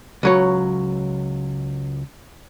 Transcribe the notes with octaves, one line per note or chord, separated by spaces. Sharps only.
C#2 F#3 C#5